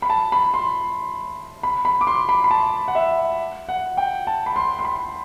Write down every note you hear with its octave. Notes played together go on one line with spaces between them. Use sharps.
B5
A5
B5
C6
B5
B5
D6
C6
B5
B5
A5
F#5
E5
F#5
G5
A5
B5
C6
C6
B5